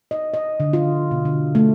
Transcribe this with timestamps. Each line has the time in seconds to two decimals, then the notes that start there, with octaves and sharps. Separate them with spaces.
0.11 D#5
0.34 D#5
0.60 D3
0.73 F4
1.11 B2
1.25 D3
1.55 A3